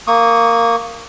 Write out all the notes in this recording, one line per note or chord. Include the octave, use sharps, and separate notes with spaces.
A#3 C#6 D#6